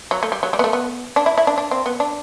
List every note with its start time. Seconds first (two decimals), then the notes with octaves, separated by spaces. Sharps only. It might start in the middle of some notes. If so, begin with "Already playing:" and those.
0.11 F#3
0.23 A3
0.32 G3
0.43 F#3
0.53 G3
0.59 B3
0.64 A3
0.73 B3
1.16 D4
1.26 E4
1.38 E4
1.47 D4
1.58 D4
1.71 C4
1.86 B3
2.00 D4